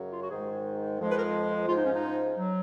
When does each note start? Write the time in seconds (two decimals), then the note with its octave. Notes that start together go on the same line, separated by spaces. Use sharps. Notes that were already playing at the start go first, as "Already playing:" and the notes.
Already playing: F#2 C#3 F#3
0.12 F4
0.22 F#4
0.31 G#2 D#3 G#3 G#4
1.00 F2 F3 G#3
1.08 B4
1.17 A#4
1.68 G#2 F3 G#3 F4
1.77 D#4
1.86 C#4
1.95 D#4
2.37 F#3